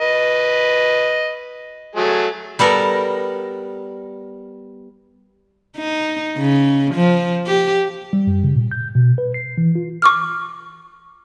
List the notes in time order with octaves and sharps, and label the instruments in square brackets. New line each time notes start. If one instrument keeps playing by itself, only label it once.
[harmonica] B4 D#5
F#3 A3 G#4
[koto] G3 B3 A4 A#4
[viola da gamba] D#4
C#3
F3
G4
[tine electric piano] G3
F#2
C#3
A#2
G6
B2
B4
C7
E3
F4
[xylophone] C#6 D6 F6